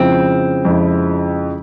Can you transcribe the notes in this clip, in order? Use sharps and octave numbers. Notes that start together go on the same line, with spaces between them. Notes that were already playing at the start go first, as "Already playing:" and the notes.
Already playing: F2 C#3 F3 G#3 C4 E4
F2 C#3 F3 G#3 E4